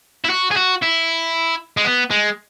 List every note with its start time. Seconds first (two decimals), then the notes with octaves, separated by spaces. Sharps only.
0.25 E4
0.30 F#4
0.51 G#4
0.56 F#4
0.82 E4
1.77 G#3
1.85 B3
2.11 G#3